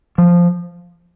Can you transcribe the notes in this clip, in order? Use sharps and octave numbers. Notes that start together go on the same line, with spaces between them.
F3